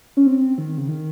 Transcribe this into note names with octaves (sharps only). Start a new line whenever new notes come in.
C#4
C4
D#3
C#3
D#3